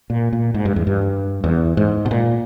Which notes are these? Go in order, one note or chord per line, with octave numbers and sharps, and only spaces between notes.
A#2
A#2
G#2
G2
E2
G2
E2
G#2
B2
A#2